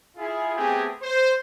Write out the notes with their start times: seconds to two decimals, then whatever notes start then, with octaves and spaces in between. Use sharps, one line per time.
0.17 E4 F4 G#4
0.56 A3 B3 C4 G4 G#4
1.02 C5